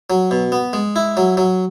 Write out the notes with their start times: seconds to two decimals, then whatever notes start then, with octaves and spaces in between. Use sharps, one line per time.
0.10 F#3
0.31 B2
0.52 B3
0.73 G#3
0.96 E4
1.17 F#3
1.37 F#3